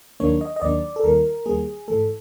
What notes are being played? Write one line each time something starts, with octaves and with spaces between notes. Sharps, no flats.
D#2 D#3 F#3 A#3 D4 C#5
D#5
D#5
D#2 D#3 F#3 A#3 D4 D5
A4
D#2 D#3 G3 A#3 A#4
D#2 D#3 G3 A#3 G#4
G#2 E3 A3 A4